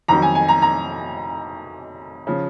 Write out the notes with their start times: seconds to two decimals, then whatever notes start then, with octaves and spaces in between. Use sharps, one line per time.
0.08 F2 D#3 F#3 A#5
0.22 G#5
0.35 G#5
0.48 A#5
0.62 A#5
2.27 C#3 F3